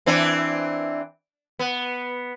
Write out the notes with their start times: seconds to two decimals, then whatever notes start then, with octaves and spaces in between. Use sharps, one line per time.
0.06 E3 C4 D4
1.59 B3